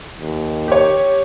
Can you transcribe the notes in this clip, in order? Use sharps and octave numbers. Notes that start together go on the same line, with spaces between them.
D#2
G4 C#5